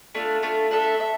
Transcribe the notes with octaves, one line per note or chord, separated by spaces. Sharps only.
A3 D4 F4
A3 D4 F4
D4 A4 E5
E5